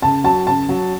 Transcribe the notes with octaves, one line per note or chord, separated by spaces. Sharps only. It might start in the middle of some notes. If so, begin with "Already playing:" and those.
C#3 A5
F#3 A5
C#3 A5
F#3